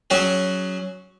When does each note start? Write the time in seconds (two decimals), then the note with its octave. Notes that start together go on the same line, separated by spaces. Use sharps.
0.10 F#3 C#4 F#4 G#4